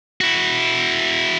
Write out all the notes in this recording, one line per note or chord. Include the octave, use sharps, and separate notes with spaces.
E4 F#4